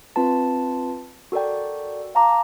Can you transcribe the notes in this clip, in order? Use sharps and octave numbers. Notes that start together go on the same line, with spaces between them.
C4 F4 B4 A5
F#4 A4 A#4 D5 G5
F5 A5 A#5 D6